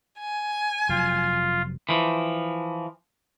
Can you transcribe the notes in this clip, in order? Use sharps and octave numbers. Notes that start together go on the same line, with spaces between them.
G#5
F1 F#3 F4
E3 F3